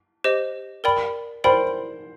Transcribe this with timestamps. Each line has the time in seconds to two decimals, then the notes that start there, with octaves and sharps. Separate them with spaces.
0.24 G4 C5 D#5
0.84 A#4 D5 G5 B5
1.44 A#4 C5 D5 G5 B5